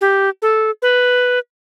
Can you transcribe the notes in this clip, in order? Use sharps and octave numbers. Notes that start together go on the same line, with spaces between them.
G4
A4
B4